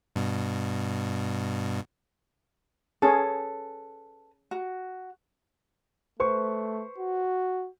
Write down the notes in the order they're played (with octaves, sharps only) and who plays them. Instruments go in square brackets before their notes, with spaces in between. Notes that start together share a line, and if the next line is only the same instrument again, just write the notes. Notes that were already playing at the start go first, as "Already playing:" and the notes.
[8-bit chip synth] G2 B2
[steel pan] C#4 G#4 [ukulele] A4 B4
[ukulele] F#4
[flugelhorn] A3 [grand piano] B4 C5 C#6
[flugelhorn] F#4